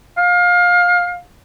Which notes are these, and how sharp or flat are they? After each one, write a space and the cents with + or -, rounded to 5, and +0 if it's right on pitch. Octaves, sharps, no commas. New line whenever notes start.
F5 +25